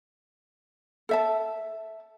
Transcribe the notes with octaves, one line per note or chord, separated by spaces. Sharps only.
A4 E5 A5